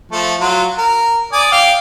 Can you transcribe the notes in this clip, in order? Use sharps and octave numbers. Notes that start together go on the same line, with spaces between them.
F3 A3
F#3 F4
A#4
D5 G#5 D#6
F5 G5